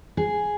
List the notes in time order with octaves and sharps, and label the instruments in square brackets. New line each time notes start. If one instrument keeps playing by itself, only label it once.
[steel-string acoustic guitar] G#4